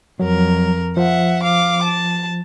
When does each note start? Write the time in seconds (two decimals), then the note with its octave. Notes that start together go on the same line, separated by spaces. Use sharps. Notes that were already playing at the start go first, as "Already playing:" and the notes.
0.20 F2 F#3 A#4
0.97 F3 E5 F#5
1.42 F5 D6
1.83 A5